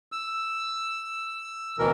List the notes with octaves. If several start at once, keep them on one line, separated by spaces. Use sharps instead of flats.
E6
D2 B2 E3 A#4